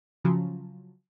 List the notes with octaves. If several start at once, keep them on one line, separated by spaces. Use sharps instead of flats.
C#3 F3 F#3